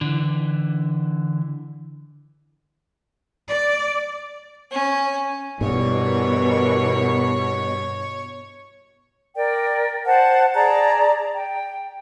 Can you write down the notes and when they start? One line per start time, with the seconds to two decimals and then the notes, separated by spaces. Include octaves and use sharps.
0.01 D3 E3
3.48 D5
4.72 C#4
5.61 G2 B2 E3 A#4 C#5
9.35 A#4 D5 G5
10.07 C5 F#5 A5
10.55 G#4 D5 A5 A#5
11.35 G5